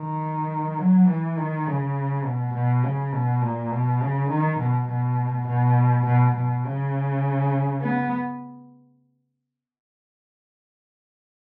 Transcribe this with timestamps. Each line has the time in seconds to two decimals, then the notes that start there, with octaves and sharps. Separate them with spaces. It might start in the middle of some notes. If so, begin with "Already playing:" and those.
Already playing: D#3
0.79 F#3
1.08 E3
1.37 D#3
1.67 C#3
2.25 B2
2.54 B2
2.83 C#3
3.13 B2
3.42 A#2
3.72 B2
4.01 C#3
4.30 D#3
4.59 B2
4.89 B2
5.47 B2
6.06 B2
6.35 B2
6.64 C#3
7.82 B3